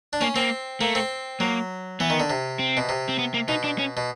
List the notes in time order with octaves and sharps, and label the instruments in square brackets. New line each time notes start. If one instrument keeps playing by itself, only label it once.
[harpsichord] D4
[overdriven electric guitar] A#3 [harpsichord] C#4
[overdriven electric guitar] A#3 [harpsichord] C4
[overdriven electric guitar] A3 [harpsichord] A#3
[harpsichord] C4
[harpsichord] F#3 [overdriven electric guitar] A#3
[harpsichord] E3 [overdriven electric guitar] B3
[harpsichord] D#3
D3
C3
[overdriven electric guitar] C4
[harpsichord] B2
C3
[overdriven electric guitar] C4
B3
A#3
[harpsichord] B2 [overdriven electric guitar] D#4
[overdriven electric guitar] D4
C#4
[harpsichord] B2